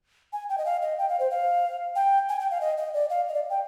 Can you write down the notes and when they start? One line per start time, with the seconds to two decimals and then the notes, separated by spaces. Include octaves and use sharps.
0.33 G#5
0.49 G5
0.58 D#5
0.65 F5
0.82 D#5
0.98 G5
1.09 F5
1.20 C5
1.31 F5
1.96 G5
2.29 G#5
2.40 G5
2.51 F5
2.61 D#5
2.78 D#5
2.94 D5
3.10 F5
3.28 D#5
3.34 D5
3.50 G5